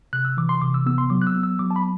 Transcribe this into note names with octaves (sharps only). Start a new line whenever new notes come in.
C3 F#6
E6
E3 D6
C6
C3 D6
E6
B3 E6
C6
F#3 D6
F#6
E6
B3
E6
F#3 D6
A5
B5